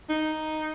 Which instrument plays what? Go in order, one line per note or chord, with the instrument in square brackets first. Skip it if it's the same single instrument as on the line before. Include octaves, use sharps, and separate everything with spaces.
[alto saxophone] D#4